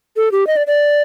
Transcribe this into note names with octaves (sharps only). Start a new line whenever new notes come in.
A4
G4
D#5
D5
D5